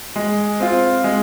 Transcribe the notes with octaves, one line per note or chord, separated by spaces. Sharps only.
G#3
C4 F4
G#3